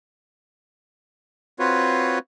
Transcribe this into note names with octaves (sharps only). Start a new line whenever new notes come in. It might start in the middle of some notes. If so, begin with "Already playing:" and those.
C4 F4 F#4 B4 C#5